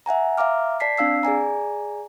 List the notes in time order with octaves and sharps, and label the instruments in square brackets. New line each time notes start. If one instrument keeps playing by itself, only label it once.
[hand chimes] E5 F#5 G#5 A#5
E5 F5 A#5 D6 F6
D5 A5 B6 C7
C4 D4 F5 E6 C7
G#4 D5 G#5 A#5